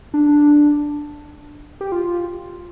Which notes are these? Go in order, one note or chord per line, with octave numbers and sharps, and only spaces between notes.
D4
G4
F4